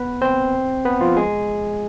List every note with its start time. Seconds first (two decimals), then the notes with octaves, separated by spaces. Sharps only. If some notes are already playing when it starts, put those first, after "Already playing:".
Already playing: B3 B4
0.22 C4 C5
0.85 B3 B4
1.01 F3 F4
1.17 G#3 G#4